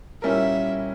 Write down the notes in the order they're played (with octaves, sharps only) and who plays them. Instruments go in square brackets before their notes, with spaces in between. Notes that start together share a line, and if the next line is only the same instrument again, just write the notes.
[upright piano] A#2 G3 C#4 E4 A#4 [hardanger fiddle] E5